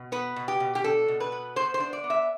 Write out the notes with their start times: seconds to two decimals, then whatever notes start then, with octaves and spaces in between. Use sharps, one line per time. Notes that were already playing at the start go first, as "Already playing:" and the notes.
Already playing: B2
0.12 B3 B4
0.36 B2
0.48 G4
0.60 B2
0.75 G4
0.84 D4 A4
1.08 B2
1.20 B4
1.32 B3
1.56 B3 C5
1.74 C5
1.80 D4
1.93 D5
2.04 B3
2.10 E5